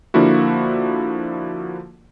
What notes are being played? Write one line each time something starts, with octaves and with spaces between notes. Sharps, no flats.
D3 F3 A#3 D4 E4 F#4